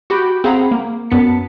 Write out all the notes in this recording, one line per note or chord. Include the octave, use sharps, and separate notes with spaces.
F#4 G4 B5 G6 D7
C4 G#4 F5 F#5 A#5 B5
A#3
F#2 B3 A5 B6 C#7